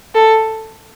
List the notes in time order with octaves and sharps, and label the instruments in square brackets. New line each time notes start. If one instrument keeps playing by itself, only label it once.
[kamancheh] A4